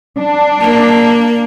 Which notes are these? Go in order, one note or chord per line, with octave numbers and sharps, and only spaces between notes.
D4
A#3